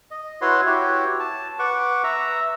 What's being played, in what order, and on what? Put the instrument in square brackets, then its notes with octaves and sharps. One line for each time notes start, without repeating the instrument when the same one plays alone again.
[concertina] D#5
E4 F#4 B4 C#5 F#5 C6
E4 F#4 G4 C#5
A5
B4 F#5 C#6 D6
E5 A#5